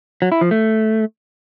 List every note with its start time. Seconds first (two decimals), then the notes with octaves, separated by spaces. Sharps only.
0.22 F#3
0.32 E4
0.41 F3
0.51 A3